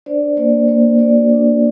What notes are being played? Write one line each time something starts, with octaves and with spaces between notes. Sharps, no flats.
D4 C5 D5
A#3 C5 D5
A#3 C5 D5
F#4 C5 D5
D4